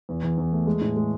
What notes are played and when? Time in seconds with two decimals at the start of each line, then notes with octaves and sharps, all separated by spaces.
0.09 E2
0.23 E2
0.38 E2
0.52 A3
0.67 G#3
0.81 A2
0.96 G#3